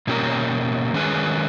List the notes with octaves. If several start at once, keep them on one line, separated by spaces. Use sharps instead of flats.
B2 A#3 C#4 G4 A#4
D#3 G#3 C#4 G#4 B4